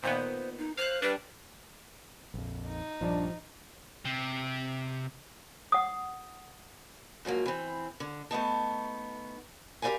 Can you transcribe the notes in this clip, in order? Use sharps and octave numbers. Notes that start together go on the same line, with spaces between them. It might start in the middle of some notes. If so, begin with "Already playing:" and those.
A#2 D#3 B3 C5
D#4
C5 F5 F#6
G3 D4 B4
A#1 F2
D#4
A#1 G2 F3 D4
C3
F#5 D#6
G#2 F3 F#3 A#3
E3 C4
D3
A3 B3 D#4 A5
G4 A#4 C5 D5 F5 G#5